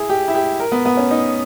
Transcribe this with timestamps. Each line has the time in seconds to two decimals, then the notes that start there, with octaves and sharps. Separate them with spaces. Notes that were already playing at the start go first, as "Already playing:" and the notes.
Already playing: E4 G#4
0.10 G4
0.28 E4
0.35 G4
0.60 A#4
0.72 B3
0.85 B3
0.97 C#4
1.11 D#4